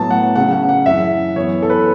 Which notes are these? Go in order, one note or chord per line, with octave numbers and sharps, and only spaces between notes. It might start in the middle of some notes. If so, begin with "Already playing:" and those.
Already playing: A2 F#3 B3 A5
F#5
C#3 F#3 C#4 F#5
F#5
F#5
F#2 E3 C#4 E5
F#2 E3 B3 C#5
A4
B4